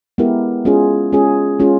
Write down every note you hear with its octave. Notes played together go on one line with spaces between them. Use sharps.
G#3 B3 E4 G4 A#4
G#3 C#4 F4 G#4
G#3 C#4 F4 G#4
G#3 C#4 F4 G#4